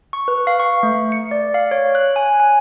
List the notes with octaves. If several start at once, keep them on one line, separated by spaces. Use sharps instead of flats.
C#6
B4
F5
C#6
A3
C#7
D5
F5
C#5
F#6
G#5
G#5